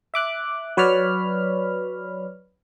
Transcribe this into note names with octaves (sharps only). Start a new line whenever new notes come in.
E5 D6 F#6
F#3 B4 C#5 D5 B5 F6